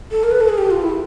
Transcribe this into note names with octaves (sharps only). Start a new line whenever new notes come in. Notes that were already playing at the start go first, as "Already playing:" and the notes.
A4
A#4
B4
A4
G#4
G4
F4
E4